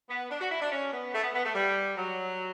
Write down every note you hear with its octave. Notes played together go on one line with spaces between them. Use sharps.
B3
D4
F#4
E4
D4
C#4
B3
A3
B3
B3
A3
G3
F#3